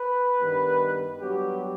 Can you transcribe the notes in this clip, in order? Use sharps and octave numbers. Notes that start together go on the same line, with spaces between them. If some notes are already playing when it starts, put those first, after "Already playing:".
Already playing: B4
G2 D#3 G3 B3
G2 F#3 B3 G4